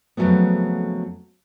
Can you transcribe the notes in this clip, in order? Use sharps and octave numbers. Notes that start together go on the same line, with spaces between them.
F2 C#3 F3 F#3 A3 B3